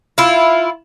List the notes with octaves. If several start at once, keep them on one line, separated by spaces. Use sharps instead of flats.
E4 F4